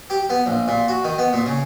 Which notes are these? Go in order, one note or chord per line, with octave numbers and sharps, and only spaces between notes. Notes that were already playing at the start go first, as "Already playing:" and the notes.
G4
B3
A#1
A#2
F#4
D#3
B3
A#2
C#3